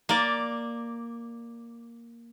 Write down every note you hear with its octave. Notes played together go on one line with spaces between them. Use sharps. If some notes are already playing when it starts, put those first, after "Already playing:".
A#3 D5